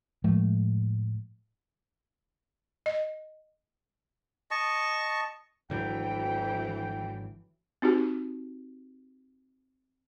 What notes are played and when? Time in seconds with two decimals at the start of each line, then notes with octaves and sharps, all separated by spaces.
0.24 A2 F3 G#3 A3
2.86 D#5
4.51 D#5 A5 C#6
5.70 G#1 D2 D3 E3 F#3 G5
7.82 C4 D#4 F#4 G4